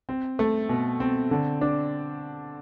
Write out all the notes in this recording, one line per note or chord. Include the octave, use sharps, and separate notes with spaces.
C4
A3
B2
C4
D3
D4